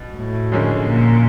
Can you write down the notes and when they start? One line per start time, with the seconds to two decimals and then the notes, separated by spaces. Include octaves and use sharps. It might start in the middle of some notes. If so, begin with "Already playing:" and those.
Already playing: B2
0.17 A2
0.52 F#2 D3 F3 G#3 C#4
0.87 A#2